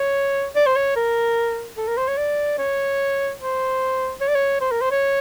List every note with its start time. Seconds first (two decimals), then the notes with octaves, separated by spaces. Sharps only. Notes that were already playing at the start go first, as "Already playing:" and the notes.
Already playing: C#5
0.55 D5
0.66 C5
0.76 C#5
0.96 A#4
1.77 A4
1.87 A#4
1.97 C5
2.08 C#5
2.18 D5
2.58 C#5
3.40 C5
4.21 C#5
4.28 D5
4.35 C#5
4.61 C5
4.71 A#4
4.81 C5
4.91 C#5